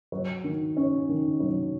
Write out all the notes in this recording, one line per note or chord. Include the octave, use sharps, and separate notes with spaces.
F#3
D#3
C#4
D#3
F#3